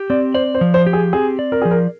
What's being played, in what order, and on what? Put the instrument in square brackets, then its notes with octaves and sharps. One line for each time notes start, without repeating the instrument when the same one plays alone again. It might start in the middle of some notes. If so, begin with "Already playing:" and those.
Already playing: [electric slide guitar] G4
[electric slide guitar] C4 [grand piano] D5
[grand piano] C5 [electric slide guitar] D5
[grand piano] C5
[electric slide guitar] F3
[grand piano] C5
[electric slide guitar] G4
[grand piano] G#4
[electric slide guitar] C4 [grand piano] G#4
[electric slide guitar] D5
[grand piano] A#4
[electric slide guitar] F3 [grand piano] G#4
[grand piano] A#4